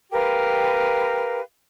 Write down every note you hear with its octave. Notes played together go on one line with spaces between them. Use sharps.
G4 A#4 B4 F5